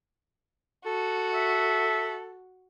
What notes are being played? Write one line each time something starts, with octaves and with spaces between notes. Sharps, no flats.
F#4 A4
E5